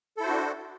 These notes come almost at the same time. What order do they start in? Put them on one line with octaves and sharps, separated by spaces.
A4 E4 C5 F#4 D4